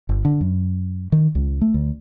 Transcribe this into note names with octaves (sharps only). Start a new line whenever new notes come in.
G1
D3
F#2
D#3
C#2
A3
D2